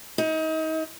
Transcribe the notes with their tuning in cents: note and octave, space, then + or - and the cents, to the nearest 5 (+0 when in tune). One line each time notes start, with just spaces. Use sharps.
D#4 +30